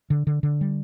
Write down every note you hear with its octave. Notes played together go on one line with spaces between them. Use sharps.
D3
D3
D3
G3